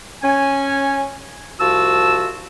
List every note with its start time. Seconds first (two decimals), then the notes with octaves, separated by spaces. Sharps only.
0.23 C#4 G#5
1.59 C2 F3 F#4 A5 E6